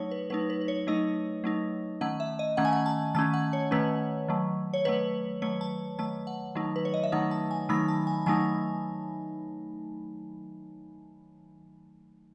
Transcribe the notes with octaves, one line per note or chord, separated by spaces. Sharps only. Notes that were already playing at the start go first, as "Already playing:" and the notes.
Already playing: F#3 A3 D#4 C#5
B4
F#3 A3 D#4 B4
B4
B4
C#5
F#3 A3 D#4 D#5
F#3 A3 D#4
D#3 A3 C#4 F#5
E5
D#5
D#3 A3 C#4 F#5
G#5
F#5
A5
D#3 A3 C#4 A5
F#5
C#5
D#3 A3 C#4 B4
D#3 F#3 A3
C#5
D#3 F#3 A3 B4
D#3 F#3 A3 C#5
A5
D#3 F#3 A3 A5
F#5
D#3 F#3 A3 D#4
B4
C#5
D#5
E5
D#3 F#3 A3 D#4 F#5
A5
G#5
D#3 F#3 A3 D#4 B5
A5
G#5
D#3 F#3 A3 D#4 G#5